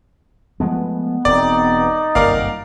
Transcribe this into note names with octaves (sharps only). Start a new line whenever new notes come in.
F3 G#3 A3 B3
E1 C4 D#4 D5
G1 C2 F#2 A#3 A#4 D5 F5